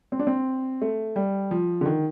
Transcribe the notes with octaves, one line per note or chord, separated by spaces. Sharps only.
C4
D4
C4
A3
G3
F3
D3
D#3